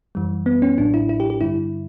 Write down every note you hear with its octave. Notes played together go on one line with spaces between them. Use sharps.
F#2 E3 G3
B3
C#4
A1 A2 F#3 D4
E4
E4
G4
G4
G2 D3 G3 E4